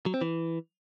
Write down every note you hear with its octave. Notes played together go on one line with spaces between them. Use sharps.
F#3
C4
E3